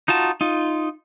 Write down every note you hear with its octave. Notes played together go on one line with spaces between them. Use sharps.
D#4 F4 F#4 A5
D#4 F4